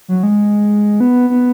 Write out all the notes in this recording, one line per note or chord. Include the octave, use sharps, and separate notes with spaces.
F#3
G#3
B3
B3